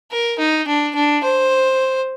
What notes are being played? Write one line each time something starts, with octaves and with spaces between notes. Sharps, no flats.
A#4
D#4
D4
D4
C5